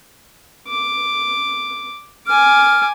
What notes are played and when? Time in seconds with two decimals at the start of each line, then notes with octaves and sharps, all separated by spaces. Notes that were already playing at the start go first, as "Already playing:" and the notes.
0.68 D6
2.27 G#5 D6 F6